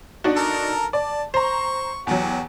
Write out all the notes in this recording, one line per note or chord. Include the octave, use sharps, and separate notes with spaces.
D4 D#4 F#4
A4 A#4 A#5
D5 A5
C5 A#5 C#6
E2 F#3 F#4 G4